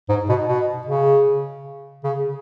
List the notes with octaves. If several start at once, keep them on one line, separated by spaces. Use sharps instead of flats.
G#2
B2
B2
C#3
C#3